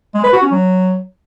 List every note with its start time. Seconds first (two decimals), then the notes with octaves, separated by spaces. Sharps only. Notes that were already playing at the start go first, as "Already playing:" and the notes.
0.14 G#3
0.24 B4
0.33 F#4
0.42 C#4
0.51 F#3